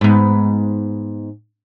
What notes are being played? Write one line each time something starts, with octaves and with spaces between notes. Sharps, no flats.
G#2 B3